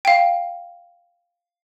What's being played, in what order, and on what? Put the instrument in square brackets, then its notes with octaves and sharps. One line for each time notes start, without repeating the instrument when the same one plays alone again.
[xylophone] F5 G5